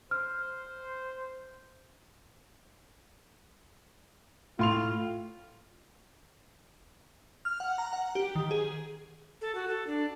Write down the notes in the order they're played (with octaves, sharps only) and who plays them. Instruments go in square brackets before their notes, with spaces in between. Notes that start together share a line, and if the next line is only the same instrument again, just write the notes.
[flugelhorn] C5 [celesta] F6
[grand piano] A2 C6 F7 [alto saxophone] F4
[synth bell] F6
F#5
A#5
F#5
G4
D#3
G#4
[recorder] A4
F#4
A4
D4